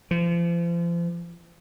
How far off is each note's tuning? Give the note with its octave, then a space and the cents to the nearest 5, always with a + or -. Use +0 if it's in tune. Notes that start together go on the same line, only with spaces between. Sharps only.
F3 -35